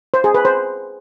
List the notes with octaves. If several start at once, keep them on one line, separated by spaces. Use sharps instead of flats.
C5
G#4
B4
C5